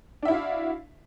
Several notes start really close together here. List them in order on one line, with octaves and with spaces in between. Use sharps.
D4 E5 E4 F#4 F5